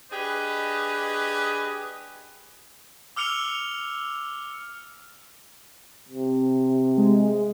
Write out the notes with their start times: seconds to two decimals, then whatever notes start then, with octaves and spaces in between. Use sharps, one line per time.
0.12 D4 G4 G#4 B4 D#5
3.16 D6 E6 F6 C#7 F7 G7
6.08 C3
6.97 G#3